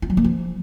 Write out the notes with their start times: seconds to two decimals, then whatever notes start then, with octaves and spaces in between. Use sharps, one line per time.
0.02 F4
0.10 F#3
0.17 A#3
0.24 F3